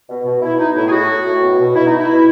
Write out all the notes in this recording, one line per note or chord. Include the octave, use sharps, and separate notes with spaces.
B2
B2
B2 E4
B2 D#4
A2 E4
G#4
A2 F#4
A2
A2
B2
B2
B2 E4
D#4
B2
E4
B2